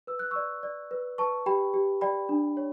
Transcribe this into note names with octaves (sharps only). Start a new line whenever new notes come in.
B4 E6
F#6
D5 C#6 E6
D5
B4
B4 A5 C#6
G4 G5 B5
G4
D5 G5 B5
D4
C#5